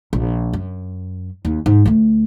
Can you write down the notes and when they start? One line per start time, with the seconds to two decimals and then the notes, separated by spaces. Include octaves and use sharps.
0.13 A#1
0.53 F#2
1.45 D#2
1.66 G#2
1.86 D2 A3